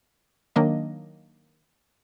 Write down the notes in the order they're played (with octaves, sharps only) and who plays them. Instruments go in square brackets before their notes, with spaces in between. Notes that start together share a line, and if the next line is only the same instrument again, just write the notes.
[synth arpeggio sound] D#3 F#3 A#3 D4 D#5